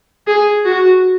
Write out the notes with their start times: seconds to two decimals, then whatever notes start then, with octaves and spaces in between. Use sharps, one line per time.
0.27 G#4
0.65 F#4